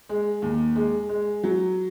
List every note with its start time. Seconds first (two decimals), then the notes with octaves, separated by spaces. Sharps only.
0.09 G#3
0.42 D#2
0.76 G#3
1.09 G#3
1.43 F#3